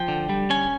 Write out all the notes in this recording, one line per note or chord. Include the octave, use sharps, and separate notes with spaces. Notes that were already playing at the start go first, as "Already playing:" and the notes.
Already playing: F3 G5
D3
G3
C#4 G#5